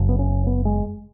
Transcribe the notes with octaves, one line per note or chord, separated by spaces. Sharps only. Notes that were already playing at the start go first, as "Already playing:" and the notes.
Already playing: F#1 F#2 C#3
B3
C#4
B3
G#3